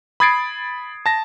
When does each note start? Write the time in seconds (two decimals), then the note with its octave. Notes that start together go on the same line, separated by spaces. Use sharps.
0.20 B5 D#6 G#6 A6 C7 D7
1.06 A5 A#6